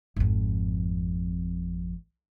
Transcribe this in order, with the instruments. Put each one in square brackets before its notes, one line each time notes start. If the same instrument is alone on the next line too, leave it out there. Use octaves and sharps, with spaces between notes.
[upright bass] G#1 F2